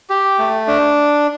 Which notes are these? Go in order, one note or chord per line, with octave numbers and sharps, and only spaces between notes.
G4
A3
D4